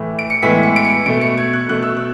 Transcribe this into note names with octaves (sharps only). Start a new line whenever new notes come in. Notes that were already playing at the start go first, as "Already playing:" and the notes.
Already playing: A2 E3 A3
D7
C#7
A2 E3 G#3 B3 B6
C#7
D7
C#7
B2 A3 D7
C#7
G#6
F#6
B2 A3 F#6
E6
F#6